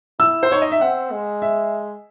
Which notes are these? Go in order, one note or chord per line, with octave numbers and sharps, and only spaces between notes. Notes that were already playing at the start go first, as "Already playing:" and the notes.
E4 E6
C5
D#4 C#5
D#5
E5
C4 F#5
G#3
E5